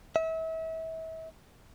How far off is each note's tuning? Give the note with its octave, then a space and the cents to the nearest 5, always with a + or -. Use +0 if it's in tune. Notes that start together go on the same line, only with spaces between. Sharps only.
E5 -35